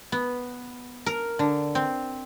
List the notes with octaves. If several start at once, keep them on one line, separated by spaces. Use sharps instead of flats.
B3
A#4
D3
C4